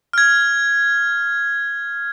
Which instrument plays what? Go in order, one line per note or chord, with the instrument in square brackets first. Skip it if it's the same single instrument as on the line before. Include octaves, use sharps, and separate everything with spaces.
[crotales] F6 G#6